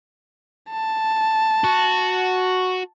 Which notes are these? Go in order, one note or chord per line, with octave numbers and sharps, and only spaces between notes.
A5
F#4